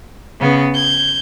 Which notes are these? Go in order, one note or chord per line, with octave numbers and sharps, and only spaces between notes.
C#3 B3
G6 G#6